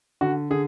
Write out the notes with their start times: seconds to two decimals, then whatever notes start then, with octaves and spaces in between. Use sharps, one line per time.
0.21 D3 F#4
0.51 D3 G#4